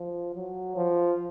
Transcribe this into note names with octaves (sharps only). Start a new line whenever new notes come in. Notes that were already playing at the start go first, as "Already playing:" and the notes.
Already playing: F3
F#3
F3